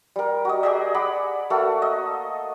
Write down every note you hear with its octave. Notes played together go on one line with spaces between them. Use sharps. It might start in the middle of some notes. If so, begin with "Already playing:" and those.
G3 A#4
F#4 D#5
G4 G#4 D5 D#5
D5 F#5 B5
A3 A#3 F#4 A4
D#5